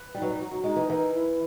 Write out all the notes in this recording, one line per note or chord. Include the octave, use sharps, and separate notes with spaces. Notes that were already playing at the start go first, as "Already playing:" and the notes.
Already playing: B4
G3 D#4
F#3
G3
F#3 F#4
F#3
G#3 D#4
E3
E3 A#4
E4